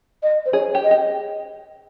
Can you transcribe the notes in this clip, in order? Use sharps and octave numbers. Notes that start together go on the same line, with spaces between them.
D#5
C5
G#4 C#5
G4
D#5
G4